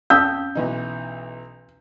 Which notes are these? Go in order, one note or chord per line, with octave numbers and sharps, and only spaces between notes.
F2 C#4 F5 A5 D#6 E6 G6
B1 E3 D#4